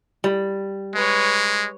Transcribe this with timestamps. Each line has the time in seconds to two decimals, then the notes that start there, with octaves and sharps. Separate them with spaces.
0.24 G3
0.95 G#3 B4 C#5